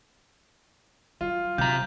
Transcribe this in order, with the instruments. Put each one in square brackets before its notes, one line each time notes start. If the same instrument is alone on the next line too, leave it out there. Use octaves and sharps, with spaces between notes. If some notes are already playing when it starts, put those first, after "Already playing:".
[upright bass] F#3 [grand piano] F4
[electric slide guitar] C3 A#5 [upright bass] F#3 [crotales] G6